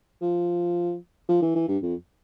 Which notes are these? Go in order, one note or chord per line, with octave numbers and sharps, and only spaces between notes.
F3
F3
E3
E3
G2
F2